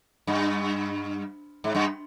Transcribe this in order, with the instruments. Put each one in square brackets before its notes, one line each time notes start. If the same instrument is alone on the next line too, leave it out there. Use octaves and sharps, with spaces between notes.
[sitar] G2
G#2
G2